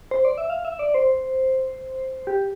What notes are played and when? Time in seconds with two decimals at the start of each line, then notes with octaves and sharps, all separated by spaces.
0.11 C5
0.25 D5
0.38 E5
0.50 F5
0.65 E5
0.79 D5
0.94 C5
2.27 G4